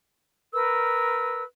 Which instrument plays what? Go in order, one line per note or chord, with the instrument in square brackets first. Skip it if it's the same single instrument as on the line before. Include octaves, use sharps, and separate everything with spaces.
[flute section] A#4 B4 E6